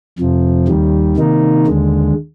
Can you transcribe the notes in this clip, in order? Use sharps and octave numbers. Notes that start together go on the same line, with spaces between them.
F2 C3 F3
D#2 D#3 G3
C3 D#3 A#3 D#4
D#2 D3 G#3